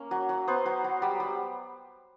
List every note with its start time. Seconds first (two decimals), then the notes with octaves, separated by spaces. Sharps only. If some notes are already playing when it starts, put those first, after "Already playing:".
Already playing: A#3 C#4 A#4
0.11 F#3
0.29 F#3
0.48 B3 C5
0.66 F#3
0.84 F#3
1.02 G3
1.20 G3